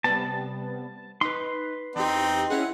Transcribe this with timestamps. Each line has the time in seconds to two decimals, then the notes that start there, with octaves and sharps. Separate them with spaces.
0.04 C3 G3 B3 A5
1.21 D#4 B4 C6
1.96 E2 C4 D#4 G4
2.50 C#4 E4 G#4 F#5